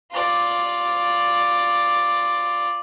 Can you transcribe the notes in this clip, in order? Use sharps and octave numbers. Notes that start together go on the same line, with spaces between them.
F4 D5